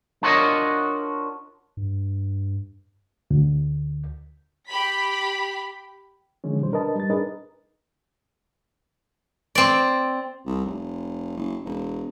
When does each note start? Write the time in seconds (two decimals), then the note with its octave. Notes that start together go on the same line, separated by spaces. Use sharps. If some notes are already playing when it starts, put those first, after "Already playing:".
0.23 D4 F4 F#4 A#4 C#5 D#5
1.77 G2
3.31 D2
4.68 G4 B5 B6
6.44 D3 D#3 F3 G#3 C#4
6.61 B2 F#3 G3 C5
6.72 D4 A#4 B4 D#5 A5
6.96 G3 A6
7.10 D4 D#4 G#4 A#4 B4 D#5
9.55 C4 D5
10.46 C2
10.65 F1
11.37 F#1
11.65 E1